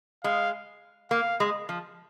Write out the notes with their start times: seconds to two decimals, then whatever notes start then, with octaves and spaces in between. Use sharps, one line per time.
0.24 G#3 F5
1.11 A#3 F5
1.40 G#3
1.69 F3